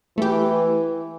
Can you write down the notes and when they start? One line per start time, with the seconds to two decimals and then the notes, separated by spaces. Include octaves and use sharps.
0.18 E3 A3 G4